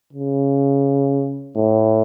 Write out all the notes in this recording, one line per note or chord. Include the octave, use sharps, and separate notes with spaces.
C#3
A2